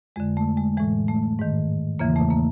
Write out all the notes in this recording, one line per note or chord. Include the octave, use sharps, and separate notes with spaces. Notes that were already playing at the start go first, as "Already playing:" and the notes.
F2 D3 G#3
A3
G#3
A2 E3 G#3
A3
G#2 D#3
E2 C#3 E3 A#3
A3
A#3